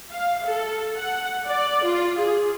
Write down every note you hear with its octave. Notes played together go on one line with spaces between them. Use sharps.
F5
A4
F#5
D5
F4
G#4